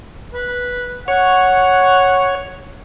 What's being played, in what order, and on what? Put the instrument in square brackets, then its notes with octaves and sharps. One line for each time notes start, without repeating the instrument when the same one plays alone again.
[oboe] B4
[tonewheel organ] C#5 [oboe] F#5